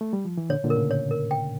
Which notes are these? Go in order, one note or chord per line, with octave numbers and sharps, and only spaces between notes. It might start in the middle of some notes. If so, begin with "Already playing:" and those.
A3
G3
F3
E3
A#2 D3 C#5
A#2 D3
A#4
A2 C#3
C#5
A#4
G5